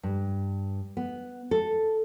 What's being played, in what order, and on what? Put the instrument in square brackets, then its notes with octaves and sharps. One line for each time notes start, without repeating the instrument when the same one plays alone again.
[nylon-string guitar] G2
B3
A4